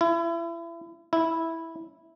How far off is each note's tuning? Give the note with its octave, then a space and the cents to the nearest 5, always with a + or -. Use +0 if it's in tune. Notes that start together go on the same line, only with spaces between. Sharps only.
E4 +30
E4 -10